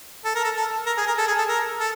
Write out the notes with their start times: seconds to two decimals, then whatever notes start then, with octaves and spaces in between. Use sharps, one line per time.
0.25 A4
0.35 A#4
0.44 A4
0.56 A4
0.86 A#4
0.98 G#4
1.07 A#4
1.18 A4
1.27 G#4
1.38 A4
1.48 A#4
1.80 A4